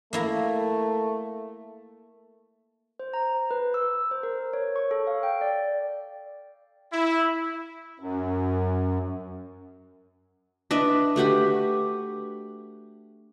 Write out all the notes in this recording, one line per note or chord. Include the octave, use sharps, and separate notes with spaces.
A3 A#3 E4 A#5
C5
A#5
B4
E6
C5
A#4
C#5
C#6
A4
F5
G5
D5
E4
F#2
D4 B4 D#5 E5
A3 F#4 G4 B4